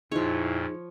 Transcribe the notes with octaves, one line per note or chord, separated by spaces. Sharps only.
F2 A#2 F3 D#4 E4 G#4 C#5